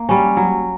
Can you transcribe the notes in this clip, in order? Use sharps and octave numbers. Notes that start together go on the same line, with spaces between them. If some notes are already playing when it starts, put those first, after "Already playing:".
Already playing: A#3
G3 C#4
F#3